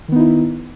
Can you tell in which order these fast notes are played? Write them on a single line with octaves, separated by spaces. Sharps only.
D#3 B3 D#4 E4